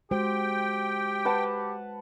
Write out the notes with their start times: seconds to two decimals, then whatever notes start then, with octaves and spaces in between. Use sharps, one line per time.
0.11 G#3 F#4 G4 C5 G5
1.25 B4 F#5 A5